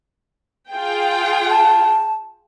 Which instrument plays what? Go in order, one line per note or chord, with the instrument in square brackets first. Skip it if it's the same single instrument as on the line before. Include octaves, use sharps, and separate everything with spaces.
[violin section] F4 G#4 G5
[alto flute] A5